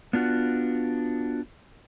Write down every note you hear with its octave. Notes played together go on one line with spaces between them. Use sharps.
B3 D4 F4 F#4